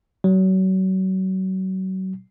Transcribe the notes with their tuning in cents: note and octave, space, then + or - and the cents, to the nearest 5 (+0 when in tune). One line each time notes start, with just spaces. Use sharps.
F#3 +30